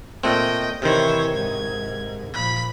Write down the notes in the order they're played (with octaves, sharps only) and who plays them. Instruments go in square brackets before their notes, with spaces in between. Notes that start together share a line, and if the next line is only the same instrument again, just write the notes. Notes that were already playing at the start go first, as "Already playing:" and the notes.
[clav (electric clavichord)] A#2 A3 C4 [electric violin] D#5 G5
[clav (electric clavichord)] C3 D#3 [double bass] E3 [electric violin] C5 C#5
[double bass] G#2 [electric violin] G#6
[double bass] A#2 F3 [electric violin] B5